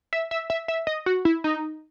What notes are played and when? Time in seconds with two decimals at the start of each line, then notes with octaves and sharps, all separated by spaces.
0.13 E5
0.31 E5
0.50 E5
0.68 E5
0.87 D#5
1.06 F#4
1.25 E4
1.44 D#4